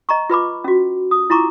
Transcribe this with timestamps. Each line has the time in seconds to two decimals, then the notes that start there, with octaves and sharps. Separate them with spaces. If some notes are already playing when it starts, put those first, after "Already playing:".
0.09 D#5 A#5 C#6
0.30 F4 B4 B5 D6
0.64 C#4 F#4
1.11 D#6
1.30 E4 F4 A#5 C#6 D6